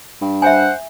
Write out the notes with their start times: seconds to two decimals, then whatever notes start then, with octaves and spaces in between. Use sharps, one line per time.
0.21 G2
0.42 C5 E5 F#5 G#5